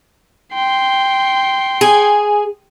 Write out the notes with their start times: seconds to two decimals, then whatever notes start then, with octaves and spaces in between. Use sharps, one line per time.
0.54 G5 C6
1.81 G#4